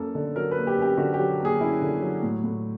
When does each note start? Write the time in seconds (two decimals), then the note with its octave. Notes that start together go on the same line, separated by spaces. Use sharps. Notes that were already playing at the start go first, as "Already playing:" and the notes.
Already playing: F#2 A#3 A4
0.15 D3
0.36 F#3 A#4
0.51 B4
0.56 A#3
0.67 G4
0.77 F#2
0.82 G4
0.97 D3 F#4
1.14 G4
1.19 F#3
1.40 A#3 G#4
1.61 F#2 E4
1.82 D3
2.02 F#3
2.23 A2
2.44 A2